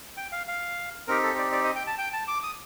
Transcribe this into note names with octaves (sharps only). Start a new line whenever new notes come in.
G5
F5
F5
C4 D#4 G4 A#4
A4
D5
D5
D#5
G5
A5
G5
A5
D6
D#6